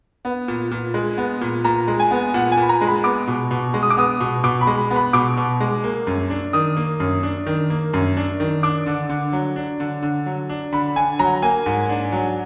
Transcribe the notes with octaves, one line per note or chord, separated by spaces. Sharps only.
B3
A#2
A#2
G#3
B3
A#2
A#2 A#5
G#3
G#5
B3
A#2 F#5
G#5
A#2 B5
A#5
G#3
B5
B3 D6
B2
B2
G#3
D#6
D6
B3 D#6
B2
B2 D6
B5
G#3
B3
B5
B2 D6
B2
G#3
A#3
F#2
D4
D#3 D#6
A#3
F#2
D4
D#3
A#3
F#2
D4
D#3
D4 D6
D3
D3
F#3
D4
D3
D3
F#3
D4
D3 B5
D3 G#5
F#3 A#5
A#3 G#5
G#2
D4
F#3